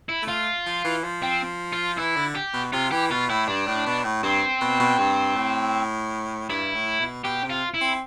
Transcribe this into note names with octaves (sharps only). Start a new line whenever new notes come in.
E4
A3
F4
F3
E3
F3
C4
F4
E3 E4
D3
G4
B2
C3 F4
E3 G4
B2 F4
A2 E4
G2 D4
A2
B2
A2
G2 C4
B2
B2
G2
A2
G2 E4
A2
B2
B2 G4
C3
F4
E4
C4